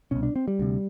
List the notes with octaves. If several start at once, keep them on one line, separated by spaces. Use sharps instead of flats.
C2 B2 C#4
D4
C4
G3
D2 C3